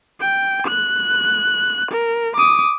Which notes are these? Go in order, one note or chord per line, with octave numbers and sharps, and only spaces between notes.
G5
F#6
A#4
D6 D#6